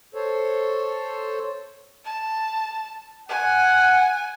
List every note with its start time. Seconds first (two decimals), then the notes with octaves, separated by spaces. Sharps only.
0.15 A4 C5 C#5
2.05 A5
3.29 F#5 G#5